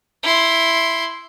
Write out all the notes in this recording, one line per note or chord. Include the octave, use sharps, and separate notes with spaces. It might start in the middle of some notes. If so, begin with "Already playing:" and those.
E4 C6